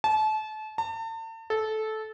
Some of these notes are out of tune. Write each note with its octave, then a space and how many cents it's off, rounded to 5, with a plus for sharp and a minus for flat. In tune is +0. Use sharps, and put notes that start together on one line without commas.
A5 -30
A5 +40
A4 -15